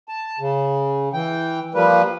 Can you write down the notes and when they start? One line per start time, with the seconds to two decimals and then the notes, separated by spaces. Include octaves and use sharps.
0.09 A5
0.39 C#3
1.14 E3 G5
1.74 F3 G3 A#3 B4